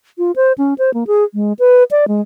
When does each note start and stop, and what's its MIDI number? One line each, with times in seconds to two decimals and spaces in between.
0.18 0.32 65
0.36 0.53 72
0.58 0.74 61
0.78 0.93 72
0.94 1.04 58
1.07 1.24 68
1.34 1.53 56
1.59 1.84 71
1.91 2.08 74
2.08 2.21 56